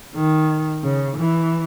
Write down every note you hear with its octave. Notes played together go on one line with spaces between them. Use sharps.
D#3
C#3
E3